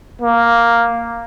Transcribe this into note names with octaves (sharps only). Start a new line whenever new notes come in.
A#3